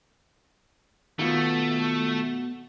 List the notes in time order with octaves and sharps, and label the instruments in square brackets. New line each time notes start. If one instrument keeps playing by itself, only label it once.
[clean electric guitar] B2 [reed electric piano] D#3 F4 [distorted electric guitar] A3